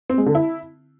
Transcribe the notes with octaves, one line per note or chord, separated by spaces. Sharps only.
C4
G#3
D3
E4